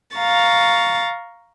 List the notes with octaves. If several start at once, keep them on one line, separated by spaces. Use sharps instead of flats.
F5 A#5 C#6 A6